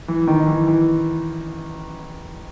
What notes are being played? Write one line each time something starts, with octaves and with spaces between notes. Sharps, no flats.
E3
D#3
E3
E3